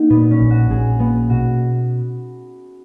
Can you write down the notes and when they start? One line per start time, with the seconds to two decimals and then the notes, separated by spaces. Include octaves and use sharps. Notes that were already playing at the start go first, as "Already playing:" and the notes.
Already playing: A#3 D#4 F#4
0.10 A#2 B3
0.31 C#4
0.40 A#1
0.51 F#4
0.70 A#1 G#4
0.99 A#3 B3
1.30 B2 F#4